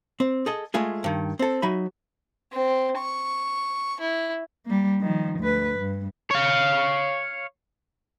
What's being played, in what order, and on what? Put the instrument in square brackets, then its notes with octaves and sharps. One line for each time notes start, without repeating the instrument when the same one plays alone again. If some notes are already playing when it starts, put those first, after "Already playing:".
[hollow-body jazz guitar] C4
G#4 A4 D#5
G#3 A3 F4 G#4
G2 D#3
C4 A4
F#3 D#4 E5 B5
[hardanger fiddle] C4
C#6
E4
[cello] G3 A#3
D#3 F3
D2 B4
G2
[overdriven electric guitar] C#5 F5